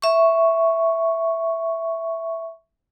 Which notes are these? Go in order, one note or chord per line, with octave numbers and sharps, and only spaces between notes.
E5 C#6